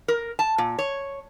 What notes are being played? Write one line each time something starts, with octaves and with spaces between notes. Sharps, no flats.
A#4
A5
A#2
C#5